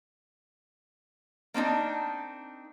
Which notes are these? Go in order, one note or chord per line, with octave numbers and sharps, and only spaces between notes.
A#3 C4 D4 D#4